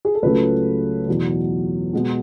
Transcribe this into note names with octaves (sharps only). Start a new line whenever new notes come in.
G#4
A4
C#2 C#3 F#3 A3 B4
E2 B2 F#3
B2 G#3 B3